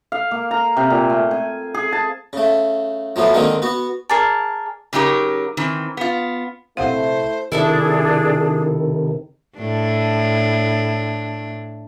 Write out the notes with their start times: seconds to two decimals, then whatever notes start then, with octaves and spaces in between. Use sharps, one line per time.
0.12 F5
0.31 A#3
0.51 A#5
0.77 C3
0.90 A#2
1.10 A3
1.31 G#5
1.74 G#4
1.92 A5
2.33 C#3 A3
3.16 F3 F#3 A3 B3
3.34 D3 D#3 G#3 A#3 C4
3.62 B3 F#4
4.09 G#4 A#4 D5 A5
4.93 C#3 F#3 D#4 G4 A#4
5.57 D#3 E3 C4
5.97 B3 F4
6.77 A#1 C3 A3 C4 E4 C5 F5 F#5
7.52 C3 D#3 D4 E4 G#4 A4 E5
9.57 A2 D4